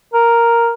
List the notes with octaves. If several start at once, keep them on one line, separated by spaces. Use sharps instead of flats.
A#4